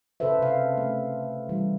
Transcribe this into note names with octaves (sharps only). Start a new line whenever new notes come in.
C#3 C#4 A4 B4 C5 E5
C3 F5
A3
E3 G3